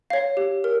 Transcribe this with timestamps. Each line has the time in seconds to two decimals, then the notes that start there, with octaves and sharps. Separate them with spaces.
0.10 C#5 F5
0.37 G4
0.64 A#4